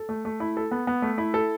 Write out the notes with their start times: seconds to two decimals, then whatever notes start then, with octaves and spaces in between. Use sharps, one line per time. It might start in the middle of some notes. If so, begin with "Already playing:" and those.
Already playing: A4
0.09 A3
0.25 A3
0.40 E4
0.57 A4
0.71 B3
0.87 B3
1.02 A3
1.18 E4
1.34 A4